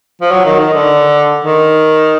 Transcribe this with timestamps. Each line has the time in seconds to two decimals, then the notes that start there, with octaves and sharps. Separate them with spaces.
0.22 F3
0.31 F#3
0.45 D#3
0.60 D#3
0.74 D3
1.44 D#3